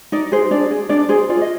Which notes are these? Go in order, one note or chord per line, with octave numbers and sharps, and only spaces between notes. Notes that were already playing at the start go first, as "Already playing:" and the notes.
D#4 D5
G#4 C5
D4 D5
G#4
D4 D5
G#4 C5
F4 D5
D#5